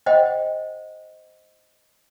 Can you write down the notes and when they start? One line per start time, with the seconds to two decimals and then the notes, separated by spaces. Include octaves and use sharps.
0.06 C5 D#5 F#5 G5